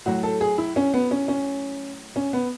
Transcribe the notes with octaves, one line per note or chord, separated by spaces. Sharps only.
A2 F#3 F#4
A4
G#4
E4
C#4
B3
C#4
C#4
C#4
B3